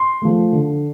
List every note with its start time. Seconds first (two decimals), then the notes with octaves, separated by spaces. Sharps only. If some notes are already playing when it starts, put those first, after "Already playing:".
Already playing: C6
0.22 F3 A3
0.53 D3